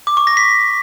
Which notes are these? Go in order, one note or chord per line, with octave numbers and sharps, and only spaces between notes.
D6
C#6
A#6
B6